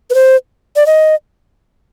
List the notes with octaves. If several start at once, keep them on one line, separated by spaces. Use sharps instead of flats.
B4
C5
D5
D#5